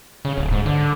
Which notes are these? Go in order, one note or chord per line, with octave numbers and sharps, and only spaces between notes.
C#3
D1
G#2
D3